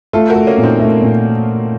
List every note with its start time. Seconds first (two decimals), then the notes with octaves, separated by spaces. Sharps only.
0.13 A3 F4 A4
0.30 F#4 A#4
0.35 A3
0.47 A#3 C#4
0.58 A#2
0.63 C4 D#4
0.79 A3
1.02 A#2